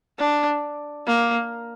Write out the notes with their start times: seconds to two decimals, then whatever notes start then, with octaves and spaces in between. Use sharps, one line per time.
0.19 D4
1.07 A#3